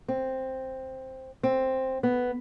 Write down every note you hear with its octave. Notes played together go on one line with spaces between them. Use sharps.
C4
C4
B3